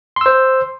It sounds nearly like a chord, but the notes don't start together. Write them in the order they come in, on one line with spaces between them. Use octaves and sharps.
C6 E6 C5